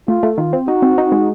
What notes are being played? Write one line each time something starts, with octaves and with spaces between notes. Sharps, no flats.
A3 F4
A3
D#3 F4
C4
D#4 F#4
C4
D#4
G#3